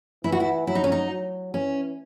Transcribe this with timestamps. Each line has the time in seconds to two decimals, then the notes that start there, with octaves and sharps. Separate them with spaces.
0.24 E3 E4
0.32 F#4
0.40 E4
0.67 F#3 E4
0.75 D#4
0.84 C#4
0.92 D#4
1.10 F#3
1.53 E3 C#4